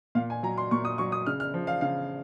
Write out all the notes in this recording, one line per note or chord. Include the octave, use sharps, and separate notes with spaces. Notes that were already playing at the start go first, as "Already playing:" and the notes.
A#2 F5
G#5
F#3 A#5
C6
A#2 C#6
D#6
F#3 C#6
D#6
C#3 F6
F6
F3
F5
C#3 F5